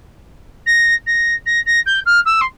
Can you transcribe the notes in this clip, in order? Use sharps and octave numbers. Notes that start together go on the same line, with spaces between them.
A#6
A#6
A#6
A#6
G6
F6
E6
C6